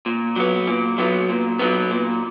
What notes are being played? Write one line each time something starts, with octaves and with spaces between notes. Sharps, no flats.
A#2
F#3 B3
A#2
F#3 B3
A#2
F#3 B3
A#2